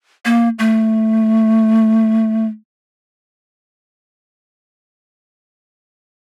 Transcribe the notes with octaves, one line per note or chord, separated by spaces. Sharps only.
A#3
A3